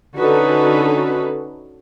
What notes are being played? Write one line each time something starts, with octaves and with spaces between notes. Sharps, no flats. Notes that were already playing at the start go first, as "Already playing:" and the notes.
D3 C#4 D#4 F#4 A4 B4